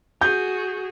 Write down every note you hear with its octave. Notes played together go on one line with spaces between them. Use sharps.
F#4 G#4 G6